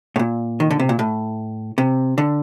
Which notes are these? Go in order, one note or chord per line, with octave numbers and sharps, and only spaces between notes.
A2
A#2
D#3
D3
C3
A#2
A2
C3
D3